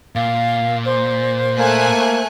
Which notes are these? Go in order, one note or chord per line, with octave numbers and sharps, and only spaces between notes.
A#2 F5
C5
A3 A#3 G#5 F#6